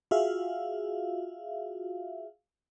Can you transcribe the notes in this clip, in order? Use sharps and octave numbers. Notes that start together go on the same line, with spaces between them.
F4 F#4 G#4 E5 F5